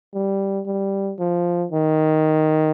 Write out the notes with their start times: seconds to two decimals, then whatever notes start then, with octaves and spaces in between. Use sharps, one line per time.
0.14 G3
0.66 G3
1.19 F3
1.72 D#3